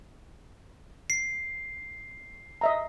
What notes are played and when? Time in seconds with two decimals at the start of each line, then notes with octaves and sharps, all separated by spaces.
1.10 C7
2.61 D#5 E5 A#5